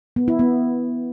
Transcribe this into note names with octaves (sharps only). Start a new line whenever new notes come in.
B3
E4
B3